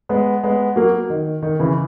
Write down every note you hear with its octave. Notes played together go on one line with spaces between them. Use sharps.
G#3 B3
G#3 B3
F#3 A#3
D#3
D#3
C#3 E3